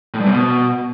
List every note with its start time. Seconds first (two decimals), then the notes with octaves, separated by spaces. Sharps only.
0.14 A2
0.20 G2
0.26 C3
0.32 B2